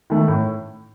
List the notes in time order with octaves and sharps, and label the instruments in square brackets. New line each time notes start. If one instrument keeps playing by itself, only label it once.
[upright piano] D#3 A3
A2